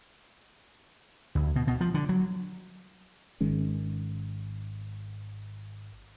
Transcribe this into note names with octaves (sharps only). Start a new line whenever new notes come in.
D2
B2
B2
F3
D3
F#3
G#1 D#3 G#3 C#4